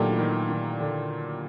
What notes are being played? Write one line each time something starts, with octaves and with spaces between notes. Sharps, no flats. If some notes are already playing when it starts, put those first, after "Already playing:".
Already playing: A#2 D#3 F#3 A3 D4 G4
E3
D#3
D#3
D3